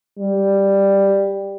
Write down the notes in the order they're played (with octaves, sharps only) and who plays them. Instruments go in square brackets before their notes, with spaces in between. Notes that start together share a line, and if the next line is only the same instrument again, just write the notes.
[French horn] G3